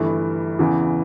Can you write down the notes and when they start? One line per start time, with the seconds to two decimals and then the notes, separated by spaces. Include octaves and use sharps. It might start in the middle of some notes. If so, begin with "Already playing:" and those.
Already playing: G1 G2 E3 A3
0.59 E2 C#3 E3